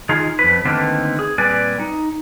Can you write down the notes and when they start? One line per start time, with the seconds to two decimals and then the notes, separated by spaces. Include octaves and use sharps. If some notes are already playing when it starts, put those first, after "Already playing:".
0.09 D#3 D#4 F4 G#4
0.39 F2 B4
0.65 D3 D#3 A3 A#3 C4 B4
1.19 G#4
1.38 A#2 G3 C4 B4 D5 G#5
1.80 D#4